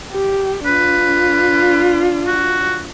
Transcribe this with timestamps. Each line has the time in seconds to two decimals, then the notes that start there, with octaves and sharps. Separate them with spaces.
0.12 G4
0.66 D4 F4 B4
2.27 F#4